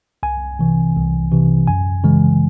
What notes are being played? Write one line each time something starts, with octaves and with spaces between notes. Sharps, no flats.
C2 G#5
C3 E3
C2
C3 E3
F#2 G#5
C#3 E3 G#3